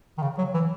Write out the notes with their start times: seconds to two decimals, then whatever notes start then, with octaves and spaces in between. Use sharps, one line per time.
0.18 D#3
0.22 C#3
0.38 F#3
0.54 E3